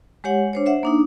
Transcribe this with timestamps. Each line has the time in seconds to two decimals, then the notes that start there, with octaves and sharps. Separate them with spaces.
0.24 G#3 G4 C#5 F#5
0.53 D4 C5 C#5
0.66 C5 E5 F#5
0.83 A#3 D4 D#4